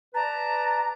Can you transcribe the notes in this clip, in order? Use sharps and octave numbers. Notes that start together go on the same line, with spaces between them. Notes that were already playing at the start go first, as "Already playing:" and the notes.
B4 D5 A5 A#5